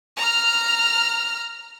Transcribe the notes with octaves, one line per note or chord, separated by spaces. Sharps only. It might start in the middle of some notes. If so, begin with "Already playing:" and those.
A#5 F6